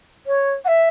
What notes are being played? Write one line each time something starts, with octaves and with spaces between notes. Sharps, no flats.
C#5
F#5
E5